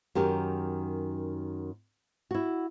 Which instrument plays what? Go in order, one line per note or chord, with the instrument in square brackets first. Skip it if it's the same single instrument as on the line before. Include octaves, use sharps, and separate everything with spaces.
[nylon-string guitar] F#2 D#3 G4 A#4
E4 F#4